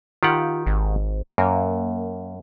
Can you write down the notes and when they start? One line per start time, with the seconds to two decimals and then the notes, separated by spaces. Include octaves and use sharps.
0.23 D#3 F4 G4 F#5
0.66 G#1
1.38 F#2 A#3